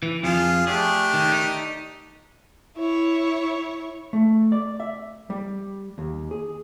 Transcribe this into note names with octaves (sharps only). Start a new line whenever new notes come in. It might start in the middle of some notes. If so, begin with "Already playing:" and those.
E3
F2 F3 F4 G#4
A3 D4 G4 G#4
D#3
D#4
E4 C#5
A3
D5
E5
G3
D#2
G#4